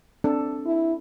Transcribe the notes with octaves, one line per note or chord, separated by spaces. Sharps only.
C4 D4 A4
E4